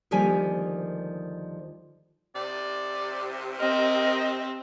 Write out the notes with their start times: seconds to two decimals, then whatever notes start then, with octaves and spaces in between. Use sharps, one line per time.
0.11 D2 D#3 F3 G3 A#3 G#5
2.35 C3 D5
3.59 C4 A#4 D#5